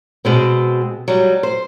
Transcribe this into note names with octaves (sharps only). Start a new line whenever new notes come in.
B2 G#3 C4
F#3 G3
C5